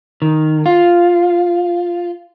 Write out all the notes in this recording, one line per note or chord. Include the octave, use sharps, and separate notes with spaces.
D#3
F4